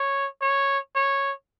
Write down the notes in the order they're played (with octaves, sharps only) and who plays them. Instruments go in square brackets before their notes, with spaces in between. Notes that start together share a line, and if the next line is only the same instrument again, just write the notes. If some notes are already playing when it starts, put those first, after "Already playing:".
Already playing: [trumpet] C#5
C#5
C#5